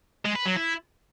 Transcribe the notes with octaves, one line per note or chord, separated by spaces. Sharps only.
G#3
B4
F#3
E4